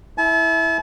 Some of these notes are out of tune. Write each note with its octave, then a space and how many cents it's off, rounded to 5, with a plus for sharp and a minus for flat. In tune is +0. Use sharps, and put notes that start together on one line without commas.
E4 -10 A5 -40